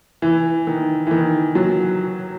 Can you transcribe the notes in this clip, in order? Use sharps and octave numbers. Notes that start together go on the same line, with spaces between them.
E3
D#3
E3
D#3
F#3